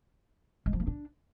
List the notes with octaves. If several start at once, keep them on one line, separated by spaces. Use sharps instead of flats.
G#3
F3
A#3
D4